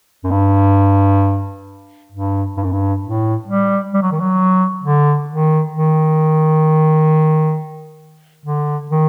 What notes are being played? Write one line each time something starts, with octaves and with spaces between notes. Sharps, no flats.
F#2
G2
G2
G2
F#2
G2
A2
G3
G3
F#3
D#3
F#3
D3
D#3
D#3
D3
D#3